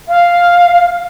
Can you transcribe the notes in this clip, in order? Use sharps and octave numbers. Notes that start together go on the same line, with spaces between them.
F5